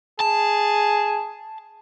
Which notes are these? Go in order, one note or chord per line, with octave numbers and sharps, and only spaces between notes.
G#4 A5